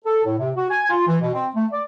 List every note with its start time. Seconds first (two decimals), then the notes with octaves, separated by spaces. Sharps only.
0.05 A4
0.25 A2
0.39 C3
0.56 F#4
0.70 G#5
0.90 F4
1.07 E3
1.21 B2
1.34 C4
1.55 A3
1.72 D5